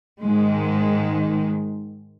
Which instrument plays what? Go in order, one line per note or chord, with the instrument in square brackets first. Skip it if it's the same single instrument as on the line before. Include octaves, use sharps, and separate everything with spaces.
[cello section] G#2 D#3 G#3